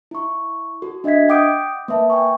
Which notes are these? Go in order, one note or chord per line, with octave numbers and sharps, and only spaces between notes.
E4 C#6
F#4 A4
D4 D#5 E5 G#6 B6
F#5 G5 D6 D#6 G6 D7
A#3 B4 E5 A5
G5 G#5 C#6